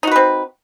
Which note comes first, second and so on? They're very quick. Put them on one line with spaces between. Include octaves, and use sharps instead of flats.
D#4 F#4 B4 C4